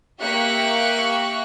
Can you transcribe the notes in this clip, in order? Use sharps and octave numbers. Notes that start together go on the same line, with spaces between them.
A#3 G4 E5 F5 C#6 F#6